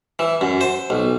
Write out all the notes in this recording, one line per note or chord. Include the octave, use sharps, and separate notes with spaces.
E3
F#2
C5
B1